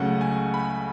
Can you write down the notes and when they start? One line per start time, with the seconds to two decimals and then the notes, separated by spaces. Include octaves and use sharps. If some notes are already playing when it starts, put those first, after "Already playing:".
Already playing: C#2 C#3 F#3 A3 C#4 F#5
0.21 G#5
0.54 B5